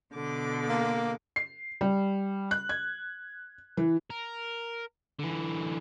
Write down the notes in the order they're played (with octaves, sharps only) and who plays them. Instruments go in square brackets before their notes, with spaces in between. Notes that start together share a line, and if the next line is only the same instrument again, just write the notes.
[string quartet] B2 D3 D6
[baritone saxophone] A#3
[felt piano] C7
G3
F#6
G#6
E3
[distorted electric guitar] A#4
D3 E3